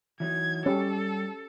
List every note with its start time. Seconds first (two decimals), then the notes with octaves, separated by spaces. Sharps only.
0.20 E3 F#3 D#4 G#6
0.66 G3 C#4 G4 A4 G5